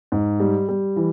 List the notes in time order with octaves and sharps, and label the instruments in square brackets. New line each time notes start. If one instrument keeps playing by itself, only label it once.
[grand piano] G#2
G3
G3
E3